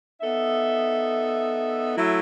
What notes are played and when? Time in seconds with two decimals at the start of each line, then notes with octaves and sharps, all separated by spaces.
0.20 B3 D#4 A4 E5
1.95 F#3 A3 E4